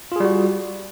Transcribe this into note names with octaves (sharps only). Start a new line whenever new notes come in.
G3 F4 F#4 G#4